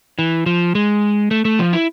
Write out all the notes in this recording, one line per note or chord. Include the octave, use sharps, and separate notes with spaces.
E3
F3
G#3
A3
A3
F3
E4